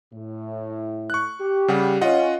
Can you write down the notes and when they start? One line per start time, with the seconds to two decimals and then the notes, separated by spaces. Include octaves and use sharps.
0.12 A2
1.10 C#6 F#6
1.40 G4
1.68 C#3 G3 F#5
2.01 C#4 F4 D#5 F#5